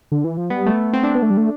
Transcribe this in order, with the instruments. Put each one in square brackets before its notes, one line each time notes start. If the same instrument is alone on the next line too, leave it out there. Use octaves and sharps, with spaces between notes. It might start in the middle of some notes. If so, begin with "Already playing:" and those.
[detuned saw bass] D3
E3
F3
[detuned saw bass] G3 [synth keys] B3
[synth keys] A3
C4
D4
[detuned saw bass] B3
A3
G3
A3